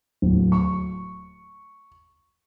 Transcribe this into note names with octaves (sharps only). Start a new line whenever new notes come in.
D1
C#6